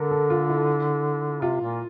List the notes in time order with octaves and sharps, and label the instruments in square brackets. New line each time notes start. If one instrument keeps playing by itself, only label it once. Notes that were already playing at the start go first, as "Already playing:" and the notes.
Already playing: [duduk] D3 [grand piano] A4 A#4
[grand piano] A4
F4
E4
[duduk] C3 [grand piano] F4
[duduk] A#2